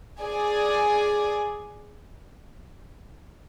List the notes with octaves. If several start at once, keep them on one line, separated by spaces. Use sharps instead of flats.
G#4 D5 G#5